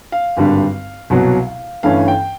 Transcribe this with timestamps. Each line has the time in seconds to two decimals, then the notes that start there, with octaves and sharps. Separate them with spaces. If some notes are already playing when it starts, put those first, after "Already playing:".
0.12 F5
0.37 G#1 G2 D3 G3
1.10 C2 B2 F#3
1.83 G1 G2 E3 A3 C#4 F5
2.08 G5